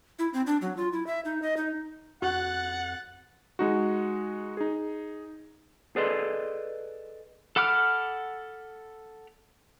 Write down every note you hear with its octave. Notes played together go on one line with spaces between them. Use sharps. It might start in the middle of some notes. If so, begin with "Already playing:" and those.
E4
C4
D4
F#3
F4
E4
E5
D#4
D#5
D#4
F2 F#4 F#5 F#6 A6
G#3 D#4 F#4
D#4 G#4
G#4 A4 B4 D5 D#5 C6
A4 F#5 B5 D6 F6